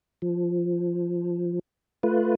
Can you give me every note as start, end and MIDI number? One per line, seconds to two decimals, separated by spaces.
0.22 1.59 53
2.03 2.35 57
2.03 2.35 65
2.03 2.35 71